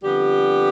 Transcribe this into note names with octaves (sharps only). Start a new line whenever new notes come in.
F2 D3 G3 B3 G4